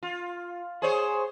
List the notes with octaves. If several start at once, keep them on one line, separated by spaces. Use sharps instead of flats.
F4
G#4 C5 C#5